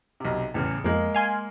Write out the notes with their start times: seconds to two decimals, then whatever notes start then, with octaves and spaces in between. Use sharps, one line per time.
0.20 B1 C3
0.54 A1 E2 C#3
0.84 F2 G#3 A#3
1.15 F5 G#5 C6